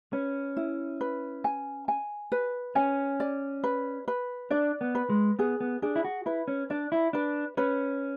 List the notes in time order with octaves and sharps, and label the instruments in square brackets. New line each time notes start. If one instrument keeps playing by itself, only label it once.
[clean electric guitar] C#4 [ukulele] B4
[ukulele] E4
B4
G#5
G#5
B4
[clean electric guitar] C#4 [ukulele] G#5
[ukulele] D5
B4
B4
[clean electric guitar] D4 [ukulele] D5
[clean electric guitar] B3
[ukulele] B4
[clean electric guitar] G#3
[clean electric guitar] B3 [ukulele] G#4
[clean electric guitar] B3
[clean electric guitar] D4 [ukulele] G#4
[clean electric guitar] E4
F#4
[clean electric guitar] E4 [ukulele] B4
[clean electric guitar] C#4
[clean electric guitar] D4 [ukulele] D5
[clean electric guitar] E4
[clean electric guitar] D4 [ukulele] B4
[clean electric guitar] C#4 [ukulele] B4